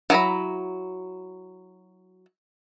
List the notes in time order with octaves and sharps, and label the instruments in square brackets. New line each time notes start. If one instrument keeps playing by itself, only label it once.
[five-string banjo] F#3 E4 G#5 A#5 B5